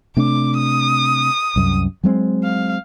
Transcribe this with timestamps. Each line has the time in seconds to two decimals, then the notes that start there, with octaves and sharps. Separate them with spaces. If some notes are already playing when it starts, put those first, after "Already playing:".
0.17 C3 A3 D4 D6
0.57 D#6
1.56 C2 F#2
2.04 F#3 G#3 C4
2.44 F5